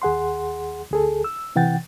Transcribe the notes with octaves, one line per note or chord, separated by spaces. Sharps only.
D#2 G#4 F#5 C6
D2 G#4 A4
E6
C3 E3 F#5 G5 A6